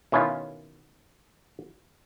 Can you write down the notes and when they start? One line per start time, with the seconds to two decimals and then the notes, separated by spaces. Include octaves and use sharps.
0.12 B2 D#3 C#4 E4 F4